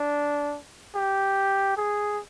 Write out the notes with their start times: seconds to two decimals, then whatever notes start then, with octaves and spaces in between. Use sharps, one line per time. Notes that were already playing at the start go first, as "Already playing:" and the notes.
Already playing: D4
0.95 G4
1.77 G#4